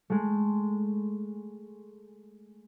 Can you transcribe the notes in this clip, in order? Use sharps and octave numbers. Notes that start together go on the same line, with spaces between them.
G#3 A3